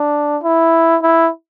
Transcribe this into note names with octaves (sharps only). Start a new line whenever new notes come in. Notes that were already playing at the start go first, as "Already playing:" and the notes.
Already playing: D4
E4
E4